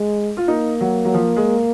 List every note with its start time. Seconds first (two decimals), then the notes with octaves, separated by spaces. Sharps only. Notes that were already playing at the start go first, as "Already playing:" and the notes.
Already playing: G#3
0.37 F4
0.48 A#3 D#4
0.81 F#3
1.05 F#3
1.14 F3
1.36 G#3